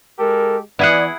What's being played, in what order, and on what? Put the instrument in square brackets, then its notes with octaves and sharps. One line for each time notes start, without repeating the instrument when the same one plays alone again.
[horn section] G#3 G4 A4 [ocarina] A#4
[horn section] E3 B3 [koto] E4 G#4 F#5 [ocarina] D5